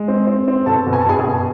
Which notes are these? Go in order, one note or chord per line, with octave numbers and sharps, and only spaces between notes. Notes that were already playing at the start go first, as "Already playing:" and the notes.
Already playing: G#3
C4
C4
C4
B2 A4 A5
B2
G#5
A5
B2 G#4 G#5
G#4 G#5
B2